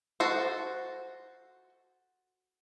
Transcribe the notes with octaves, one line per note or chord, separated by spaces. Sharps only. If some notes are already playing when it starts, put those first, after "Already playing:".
F#4 A4 C5